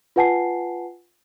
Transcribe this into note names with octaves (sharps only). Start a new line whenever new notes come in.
F4 B4 F#5 G#5 A5 C7